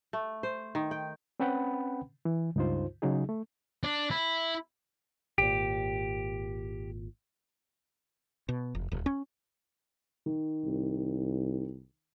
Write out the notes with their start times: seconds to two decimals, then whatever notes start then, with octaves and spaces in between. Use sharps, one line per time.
0.13 A3
0.43 C5
0.75 D#3
0.91 G5
1.40 C4 C#4 B4 F#5 G5 B5
2.25 E3
2.56 C#2 G2 D#4 F4 C5
3.02 C#3 F#3 D#4 G#4
3.29 A3
3.83 D4
4.11 E4
5.38 G#1 A#2 G4
8.49 B2
8.75 F1
8.92 D#1
9.06 C#4
10.26 D#3
10.64 C2